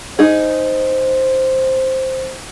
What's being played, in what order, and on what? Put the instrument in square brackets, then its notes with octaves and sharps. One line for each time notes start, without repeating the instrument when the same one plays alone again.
[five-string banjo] D#4 G#4 [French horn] C5